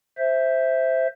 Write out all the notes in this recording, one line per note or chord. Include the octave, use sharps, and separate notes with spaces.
C5 E5